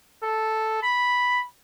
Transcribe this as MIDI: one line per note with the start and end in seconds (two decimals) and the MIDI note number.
0.23 0.78 69
0.83 1.40 83